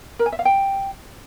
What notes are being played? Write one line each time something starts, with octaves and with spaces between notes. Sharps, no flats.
A#4
G#5
E5
F5
G5